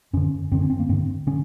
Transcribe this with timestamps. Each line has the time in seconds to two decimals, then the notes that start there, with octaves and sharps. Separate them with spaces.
0.13 F#2 D3 C#4
0.51 F#2 D3 C4
0.61 C#4
0.70 C4
0.80 A#3
0.89 G2 D3 C4
1.27 D3 C#4